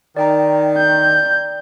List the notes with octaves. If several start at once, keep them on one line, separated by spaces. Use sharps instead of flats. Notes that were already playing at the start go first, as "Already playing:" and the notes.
D#3 D5 G5 A#5
G6